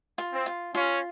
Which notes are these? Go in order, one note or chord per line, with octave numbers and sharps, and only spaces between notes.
F4
C4
F4
C#4 F4